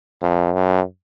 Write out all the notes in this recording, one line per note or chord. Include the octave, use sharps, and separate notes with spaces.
F2
F#2